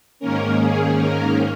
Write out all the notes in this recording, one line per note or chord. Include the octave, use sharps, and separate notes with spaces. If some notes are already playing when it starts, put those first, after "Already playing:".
G#2 D#3 A#3 C#4 A#4
G#4
A#4